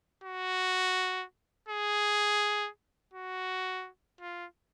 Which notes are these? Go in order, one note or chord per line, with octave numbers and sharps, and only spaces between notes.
F#4
G#4
F#4
F4